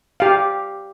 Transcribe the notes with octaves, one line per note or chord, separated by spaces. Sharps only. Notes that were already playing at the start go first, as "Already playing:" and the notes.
G4 F5